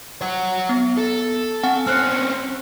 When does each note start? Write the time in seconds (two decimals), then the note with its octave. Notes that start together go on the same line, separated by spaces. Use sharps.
0.21 C#5 F#5
0.69 B3
0.97 A4
1.63 C4 F#5 G#5
1.87 C4 C#4 F6 F#6 C#7